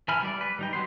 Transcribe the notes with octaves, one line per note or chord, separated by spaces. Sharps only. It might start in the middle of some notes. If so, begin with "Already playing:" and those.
E3 E5 G#5 B5 F6
G3 D5
B4
G3 D#4 G5
F#3 B3 C6